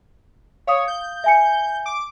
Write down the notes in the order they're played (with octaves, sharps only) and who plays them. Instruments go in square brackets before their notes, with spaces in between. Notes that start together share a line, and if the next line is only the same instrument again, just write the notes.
[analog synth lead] C#5 [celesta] F5 D#6
[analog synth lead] G6
[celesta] E5 G#5 C#7
[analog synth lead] D6